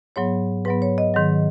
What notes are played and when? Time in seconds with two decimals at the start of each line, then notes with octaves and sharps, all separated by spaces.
0.16 G#2 F#3 B3 C#5
0.65 G#2 F#3 B3 B4
0.82 C#5
0.98 D#5
1.14 G#2 D#3 F#3